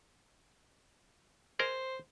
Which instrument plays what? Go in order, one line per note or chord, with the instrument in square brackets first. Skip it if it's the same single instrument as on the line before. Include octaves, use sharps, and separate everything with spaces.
[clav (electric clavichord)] G#4 A#4 D#5 [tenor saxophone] C5